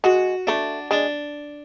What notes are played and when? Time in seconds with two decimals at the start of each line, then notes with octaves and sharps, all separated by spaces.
0.04 G#3 F#4
0.47 A3 D4
0.91 G#3 D4